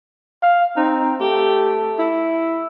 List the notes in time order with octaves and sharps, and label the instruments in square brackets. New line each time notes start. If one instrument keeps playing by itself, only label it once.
[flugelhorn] F5
[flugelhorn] C4 [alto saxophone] D#4
[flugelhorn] A3 [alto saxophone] G4
[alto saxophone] E4